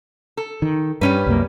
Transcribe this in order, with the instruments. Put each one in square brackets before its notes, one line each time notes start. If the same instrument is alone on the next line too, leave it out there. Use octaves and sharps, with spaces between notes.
[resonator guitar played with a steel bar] A4
[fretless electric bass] D#3
[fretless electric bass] G2 [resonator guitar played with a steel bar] G3 C#4 B4
[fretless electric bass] C2 F#2 A#3